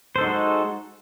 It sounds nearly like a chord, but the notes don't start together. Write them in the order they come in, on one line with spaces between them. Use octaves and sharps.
C5 A4 D#4 F#4 G#3